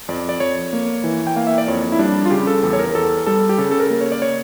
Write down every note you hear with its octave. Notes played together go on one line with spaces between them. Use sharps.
F2 D5
D5
F2 C#5
A#3
E3
G5
A#3 F5
E5
D5
F2 C#5
E4
G3 D4
F4
C#3 G4
A4
E2 A4
C#5
A#4
E2 A4
G3 A4
G4
C#3 A4
A4
A#4
A#3
C#5
D5
C#5